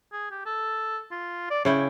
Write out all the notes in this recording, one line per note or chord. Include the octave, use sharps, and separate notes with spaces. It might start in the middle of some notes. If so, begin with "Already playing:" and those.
G#4
G4
A4
F4
D5
C#3 E4 C#5 G5